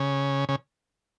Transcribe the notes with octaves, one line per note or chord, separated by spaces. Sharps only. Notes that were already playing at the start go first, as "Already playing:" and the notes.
Already playing: C#3
C#3